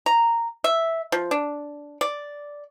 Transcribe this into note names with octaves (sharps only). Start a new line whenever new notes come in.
A#5
E5
F3
D4
D5